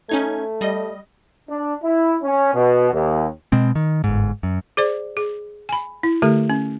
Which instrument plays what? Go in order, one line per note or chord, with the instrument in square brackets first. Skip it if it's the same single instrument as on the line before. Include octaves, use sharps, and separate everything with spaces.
[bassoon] A3 [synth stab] C#4 D#4 G#6
[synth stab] G3 D#5
[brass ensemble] D4
E4
C#4
B2
D#2
[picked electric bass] B2 G#3 C4
D#3
G1 G#2
F#2
[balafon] G#4 C5 D5
G#4
G#5 B5
E4
D3 A3 G4 A4
C#4